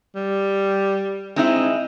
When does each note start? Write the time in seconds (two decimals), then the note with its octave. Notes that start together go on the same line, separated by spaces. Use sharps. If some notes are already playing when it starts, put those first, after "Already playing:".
0.15 G3
1.36 G#3 C4 D#4 E4